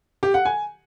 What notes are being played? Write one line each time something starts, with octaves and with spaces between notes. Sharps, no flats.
G4
F#5
G#5